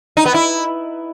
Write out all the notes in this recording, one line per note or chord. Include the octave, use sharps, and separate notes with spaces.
D#4
B3
E4